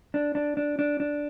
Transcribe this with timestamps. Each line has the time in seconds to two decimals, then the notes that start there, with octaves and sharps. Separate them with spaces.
0.14 D4
0.35 D4
0.57 D4
0.79 D4
1.00 D4